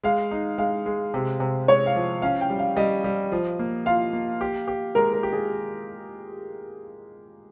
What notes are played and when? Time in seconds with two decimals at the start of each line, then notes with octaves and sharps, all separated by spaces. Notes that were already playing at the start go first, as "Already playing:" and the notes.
0.04 G#3 F5
0.31 D#4
0.58 G#3 F5
0.86 G#3
1.14 C3
1.40 C3
1.68 G#3 C#5
1.86 F5
1.96 F3
2.22 C#4 F5
2.41 G5
2.50 G3
2.59 F5
2.77 G3 D#5
3.04 G3
3.32 F3
3.59 A#3
3.86 F4 F5
4.13 A#3
4.41 G4
4.68 G4
4.95 G#3 A#4
5.13 A#4
5.23 G4
5.33 G#4